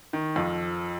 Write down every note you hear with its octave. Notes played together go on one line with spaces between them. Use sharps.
D#3
F2 F3